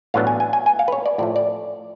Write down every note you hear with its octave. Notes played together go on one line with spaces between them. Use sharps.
A1 A2 F#3 B3 D4 F5
G#5
G#5
G#5
G#5
F5
B4
C#5
D5
A2 F3 A3 D5
D5